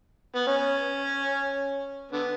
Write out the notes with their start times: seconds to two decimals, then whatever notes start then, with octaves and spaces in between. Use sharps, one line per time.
0.35 B3
0.47 C#4
2.12 D3 B3